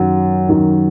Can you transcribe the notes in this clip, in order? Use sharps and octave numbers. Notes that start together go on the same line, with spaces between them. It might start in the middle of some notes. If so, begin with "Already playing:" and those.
Already playing: F#2 D#3 F#3
F#2 D#3 F#3